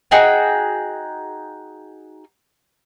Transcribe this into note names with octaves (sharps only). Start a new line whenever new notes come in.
D#4 F#4 G#4 G5